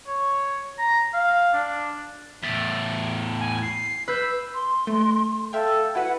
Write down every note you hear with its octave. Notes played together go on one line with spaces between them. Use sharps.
C#5
A#5
F5
D4
E2 A2 A6 B6
G#5
C7
B4 E6 G6
C6
A3
A4 E5 F5 G5
E4 F#4 B4 F#5